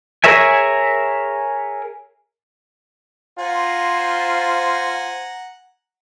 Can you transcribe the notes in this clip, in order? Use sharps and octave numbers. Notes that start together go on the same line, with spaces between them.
G#4 A#4 C#5 E5 G#5
F4 C5 F#5 G#5 A#5